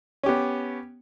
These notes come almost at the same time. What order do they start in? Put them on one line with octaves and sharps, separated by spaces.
C#4 G4 B3